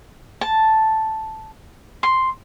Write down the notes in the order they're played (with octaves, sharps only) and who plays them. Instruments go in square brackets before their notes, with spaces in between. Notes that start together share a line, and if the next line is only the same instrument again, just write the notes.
[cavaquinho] A5
C6